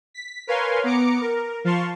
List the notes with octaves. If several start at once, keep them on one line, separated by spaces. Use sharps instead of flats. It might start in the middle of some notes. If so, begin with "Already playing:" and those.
B6
A#4 B4 C#5 F5 G#5 C6
B3 A#5 D6 C#7
A#4
F3 F5 A5 C6 C#6